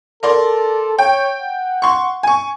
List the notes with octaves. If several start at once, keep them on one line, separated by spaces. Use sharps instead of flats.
A4 A#4 D5 C6
C#5 G5
F#5
C6 C#6
G#5 C#6